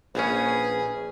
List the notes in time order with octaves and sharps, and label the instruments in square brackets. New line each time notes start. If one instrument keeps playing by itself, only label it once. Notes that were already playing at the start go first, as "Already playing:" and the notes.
[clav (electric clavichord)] A#1 C#4 [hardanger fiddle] G#4 [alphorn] B4